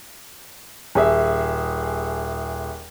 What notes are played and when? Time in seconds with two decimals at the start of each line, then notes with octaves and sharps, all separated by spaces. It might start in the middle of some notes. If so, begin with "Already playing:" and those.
0.95 D#1 G#4 E5